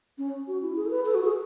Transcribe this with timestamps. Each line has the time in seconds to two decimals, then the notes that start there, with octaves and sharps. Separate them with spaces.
0.18 C#4
0.48 F#4
0.62 E4
0.76 G#4
0.86 A4
0.91 B4
1.06 A4
1.15 F#4
1.25 G#4